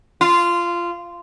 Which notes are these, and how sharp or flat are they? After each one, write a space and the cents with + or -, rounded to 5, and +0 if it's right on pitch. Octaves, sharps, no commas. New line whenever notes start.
F4 -15